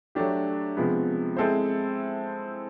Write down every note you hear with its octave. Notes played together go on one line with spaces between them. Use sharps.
F#3 A3 D4 G4
C3 F3 G#3 B3
G#3 C4 E4 A4 C5